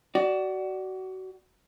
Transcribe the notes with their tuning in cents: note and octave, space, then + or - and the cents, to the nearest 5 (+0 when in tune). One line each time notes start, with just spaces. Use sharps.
F#4 +25 D5 +0